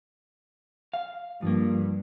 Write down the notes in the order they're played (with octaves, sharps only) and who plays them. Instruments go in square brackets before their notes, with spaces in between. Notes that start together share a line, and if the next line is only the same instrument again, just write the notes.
[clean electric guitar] F5
[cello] G2 [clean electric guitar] F3 A#3